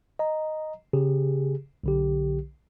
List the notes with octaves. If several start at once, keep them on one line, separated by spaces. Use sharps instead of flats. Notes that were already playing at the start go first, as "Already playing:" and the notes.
D#5 A#5
C#3 G4 G#4
B1 D3 G4